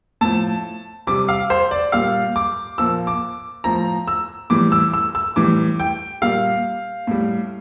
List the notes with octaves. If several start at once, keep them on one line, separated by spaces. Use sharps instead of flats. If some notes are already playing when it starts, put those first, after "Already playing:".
A2 F3 A5
C3 G3 D6
F5
C5
D5
A#2 G3 F5
D6
A#2 F3 E6
D6
A2 F3 A#5
E6
A2 E3 G3 D6
E6
E6
E6
A2 E3 G3 D6
G5
A#2 G3 F5
A2 G3